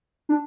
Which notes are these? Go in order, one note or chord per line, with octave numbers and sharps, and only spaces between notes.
D4